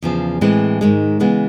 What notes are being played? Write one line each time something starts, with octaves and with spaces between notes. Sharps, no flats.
E2 C#3 F3
A2 E3 G#3 C4 E4
G#2 D#3 G#3
C#3 E3 G#3 B3